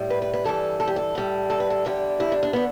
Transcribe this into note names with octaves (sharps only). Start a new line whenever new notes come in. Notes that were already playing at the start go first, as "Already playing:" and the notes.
Already playing: A2 G3
B4
B4
B4
G2 E3 G3 A4
A4
G4
A4
A2 G3
A4
B4
A4
E2 D3 G3 G4
E4
D4
D4
D3 B3